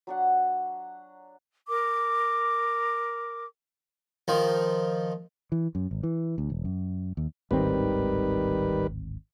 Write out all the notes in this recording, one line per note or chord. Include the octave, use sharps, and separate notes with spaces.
F#3 D4 F#5
A#4 D6
D#3 F3
E3
F#2
G#1
E3
D2
E1
F#2
D#2
D1 G#1 D#3 G3 C4 B4